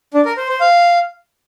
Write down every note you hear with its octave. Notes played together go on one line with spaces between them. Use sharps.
D4
A#4
C5
C5
F5